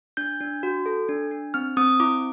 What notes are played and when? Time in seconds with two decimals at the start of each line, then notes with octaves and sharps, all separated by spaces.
0.17 D4 G6
0.40 D4
0.63 F#4
0.86 A4
1.09 D4
1.31 D4
1.54 C4 F6
1.77 C4 D#6
2.00 E4 D6